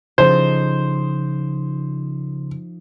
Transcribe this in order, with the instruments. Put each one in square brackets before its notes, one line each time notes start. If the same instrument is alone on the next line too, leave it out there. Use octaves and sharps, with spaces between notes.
[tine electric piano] C#3 [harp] F3 D#4 A4 [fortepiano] C5